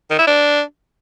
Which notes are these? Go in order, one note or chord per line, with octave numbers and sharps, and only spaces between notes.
D#3
E4
D4